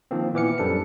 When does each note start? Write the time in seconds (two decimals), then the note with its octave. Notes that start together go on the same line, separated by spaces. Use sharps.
0.11 D#3 F3 A#3 C4
0.34 A#2 E3 B3 D6 F6 C#7
0.58 F#2 G3 D4 A4 C5 C#7